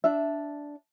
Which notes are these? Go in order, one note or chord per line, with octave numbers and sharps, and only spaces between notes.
D4 E5